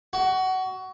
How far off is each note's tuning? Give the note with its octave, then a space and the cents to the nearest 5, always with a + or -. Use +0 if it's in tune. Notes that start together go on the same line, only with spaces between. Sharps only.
F#4 +20